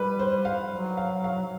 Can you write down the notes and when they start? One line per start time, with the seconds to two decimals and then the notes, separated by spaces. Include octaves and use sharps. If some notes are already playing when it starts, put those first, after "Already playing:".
Already playing: G3 B4
0.19 C5
0.45 F5
0.72 F#3
0.97 F5
1.24 F5